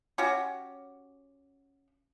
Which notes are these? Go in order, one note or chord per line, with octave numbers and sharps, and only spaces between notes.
C#4 F#4 G4